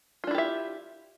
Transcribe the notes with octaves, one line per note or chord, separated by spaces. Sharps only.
D4 E4 F4 G4 E5